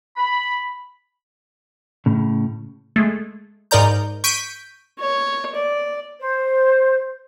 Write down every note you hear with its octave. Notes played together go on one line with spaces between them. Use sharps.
B5
A2 C#3
G#3 A3
G#2 D#4 A#4 D5 A#5 G6
C#6 G6 B6 D7 D#7
C#5
D5
C5